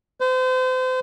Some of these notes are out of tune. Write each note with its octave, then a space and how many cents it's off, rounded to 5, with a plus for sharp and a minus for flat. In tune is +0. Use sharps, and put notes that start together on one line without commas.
C5 -35